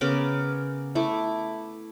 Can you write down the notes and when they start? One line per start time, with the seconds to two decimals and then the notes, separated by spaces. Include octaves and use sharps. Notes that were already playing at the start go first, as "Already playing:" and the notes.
0.01 C#3 B3 A#4 D6
0.95 A3 E4 D6